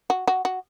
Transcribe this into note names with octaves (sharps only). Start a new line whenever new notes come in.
F#4
F#4
F#4